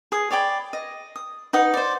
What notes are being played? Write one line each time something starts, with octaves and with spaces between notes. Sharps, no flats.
G#4 D#6
C#5 D5 G5 B5
D#5
D#6
D#4 B4 F#5 D#6
C5 D5